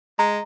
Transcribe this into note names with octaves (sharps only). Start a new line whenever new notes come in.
G#3 A#5